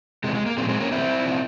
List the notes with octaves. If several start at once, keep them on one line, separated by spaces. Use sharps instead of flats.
C3 E3 G#3
G#3
A#3
A#2 F3 G#3 C4
G#3 C4
A#3 C#4
C3 E3 C4 E4
C3 F3